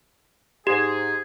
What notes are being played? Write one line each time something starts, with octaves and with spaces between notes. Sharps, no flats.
G#2 G4 G#4